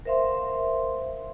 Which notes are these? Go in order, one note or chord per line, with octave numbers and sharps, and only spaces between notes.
A#4 C5 E5 F5 C6